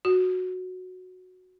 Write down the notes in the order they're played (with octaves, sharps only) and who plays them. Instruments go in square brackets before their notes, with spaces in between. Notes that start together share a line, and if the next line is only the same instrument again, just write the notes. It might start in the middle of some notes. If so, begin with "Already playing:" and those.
[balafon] F#4